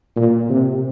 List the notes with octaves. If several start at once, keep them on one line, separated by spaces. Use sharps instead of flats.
A#2
C3